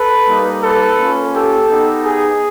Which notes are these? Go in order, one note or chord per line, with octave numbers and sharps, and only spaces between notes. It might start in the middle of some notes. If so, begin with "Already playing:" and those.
Already playing: A4 B4
G3 A#3 D#4
A4 B4
A#3 C#4 F4
G4 A4
B3 D#4 G4
G#4